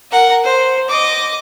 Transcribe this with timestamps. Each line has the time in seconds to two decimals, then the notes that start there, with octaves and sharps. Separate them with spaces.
0.11 A#4 F#5
0.43 C5
0.88 D#5 D6